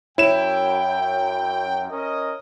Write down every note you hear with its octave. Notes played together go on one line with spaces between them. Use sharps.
F#2 E4 C#5 G5 E7
C#4 A#4 D#5